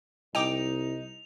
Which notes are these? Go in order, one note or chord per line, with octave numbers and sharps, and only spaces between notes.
C2 D#4 G5 D6 F7